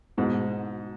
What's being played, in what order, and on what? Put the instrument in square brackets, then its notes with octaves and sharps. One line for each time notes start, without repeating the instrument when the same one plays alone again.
[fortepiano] G#2 B2